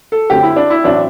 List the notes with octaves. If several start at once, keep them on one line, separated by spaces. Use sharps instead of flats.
A4
F#2 D3 A3 C4 G4
E4
D4
E4
A1 F#3 C4 D4